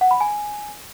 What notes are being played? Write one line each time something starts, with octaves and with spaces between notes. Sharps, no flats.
F#5
B5
G#5